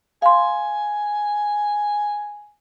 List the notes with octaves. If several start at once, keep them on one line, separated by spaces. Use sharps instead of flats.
F5 G#5 C6